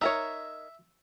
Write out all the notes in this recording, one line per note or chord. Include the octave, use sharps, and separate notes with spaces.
D#4 A#4 C#5 E5